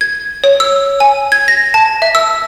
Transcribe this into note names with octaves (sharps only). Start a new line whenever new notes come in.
G#6
C#5
E6
G#5
G#6
A#6
A5
E5
E6